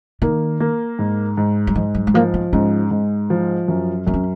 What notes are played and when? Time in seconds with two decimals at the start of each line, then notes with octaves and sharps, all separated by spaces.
0.22 D#3 A#3
0.60 A#3
0.99 G#2
1.37 G#2
1.67 F#3
1.75 G#2 F3
1.95 F#3
2.07 G#3
2.14 F3 A#3
2.34 B3
2.53 G#2 C#4
2.91 G#2
3.30 F3
3.68 F#2
4.07 F#2 B3
4.14 C#4